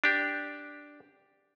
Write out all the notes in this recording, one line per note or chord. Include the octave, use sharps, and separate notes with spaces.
D4 G4